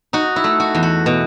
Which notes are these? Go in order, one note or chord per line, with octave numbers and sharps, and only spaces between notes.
D#4 F#4
E4
A3
F#4
E2
F#4
B2